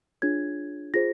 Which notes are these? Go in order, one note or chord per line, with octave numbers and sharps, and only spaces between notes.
D4 F4 G#4 C#5 G#6
F4 G#4 C5 A#6